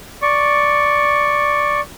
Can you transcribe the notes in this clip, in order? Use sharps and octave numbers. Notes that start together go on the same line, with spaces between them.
D5 C#6